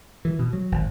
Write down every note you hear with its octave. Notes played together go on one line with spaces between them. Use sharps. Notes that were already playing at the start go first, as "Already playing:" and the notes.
E3
B2
F#3
G#1